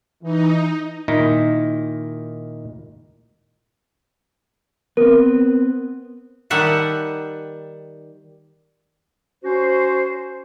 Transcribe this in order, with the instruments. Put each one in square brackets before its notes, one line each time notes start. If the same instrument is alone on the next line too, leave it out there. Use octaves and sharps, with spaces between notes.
[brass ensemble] E3 [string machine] D#4
[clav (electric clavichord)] A#2 D#3 D#4 E4
[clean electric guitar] B3 C4 [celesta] A#4
[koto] D#3 G3 E5 F#5 A5
[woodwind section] C#4 F#4 C5